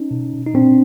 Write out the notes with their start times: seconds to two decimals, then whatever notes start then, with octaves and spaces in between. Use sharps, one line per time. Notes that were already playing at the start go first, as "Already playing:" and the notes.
Already playing: C#4 D#4
0.11 B2
0.33 B2
0.46 D#4
0.54 A#2 C4 D4